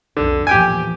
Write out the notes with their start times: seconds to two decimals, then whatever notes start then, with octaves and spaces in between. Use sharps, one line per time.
0.17 B1 F2 D3
0.47 E2 A#2 F3 G4 G5 G#5